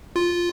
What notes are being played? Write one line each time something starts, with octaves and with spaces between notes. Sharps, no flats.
F4